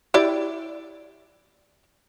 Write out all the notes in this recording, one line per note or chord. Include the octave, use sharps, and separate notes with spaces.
E4 G4 D5